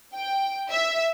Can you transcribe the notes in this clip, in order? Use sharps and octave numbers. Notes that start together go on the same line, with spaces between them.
G5
E5